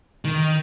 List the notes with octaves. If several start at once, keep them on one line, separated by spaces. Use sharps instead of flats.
D#3